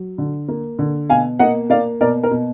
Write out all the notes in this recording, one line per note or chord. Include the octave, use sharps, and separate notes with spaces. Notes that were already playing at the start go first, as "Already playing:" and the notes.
Already playing: F#3
D3
A#3
D3
B2 F5 G#5
A#3 D#5 F#5
A#3 D5 F5
B2 A#4 D5
A#4
B2